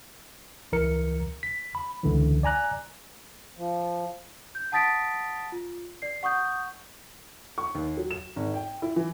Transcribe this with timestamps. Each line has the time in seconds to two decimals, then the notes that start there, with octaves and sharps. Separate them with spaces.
0.72 C#2 E3 A#4 C#7
1.43 B6
1.75 B5
2.04 C#2 D3 E3
2.43 D5 G#5 A#5 F#6
3.57 F3
4.55 G6
4.72 F#5 A5 D#6 A6 B6 D7
5.52 F4
6.02 D5 C7
6.23 F#5 C#6 D#6 G6
7.58 C#6
7.75 D#2
7.97 F#3
8.11 E7
8.36 G#1
8.54 G5
8.82 E4
8.96 E3